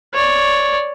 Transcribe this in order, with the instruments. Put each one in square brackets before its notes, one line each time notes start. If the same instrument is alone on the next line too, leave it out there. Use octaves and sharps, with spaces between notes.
[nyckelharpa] C#5 D5